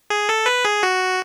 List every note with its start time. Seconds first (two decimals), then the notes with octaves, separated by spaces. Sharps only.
0.10 G#4
0.29 A4
0.46 B4
0.65 G#4
0.83 F#4